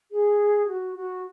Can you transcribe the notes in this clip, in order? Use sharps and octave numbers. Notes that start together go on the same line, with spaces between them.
G#4
F#4
F#4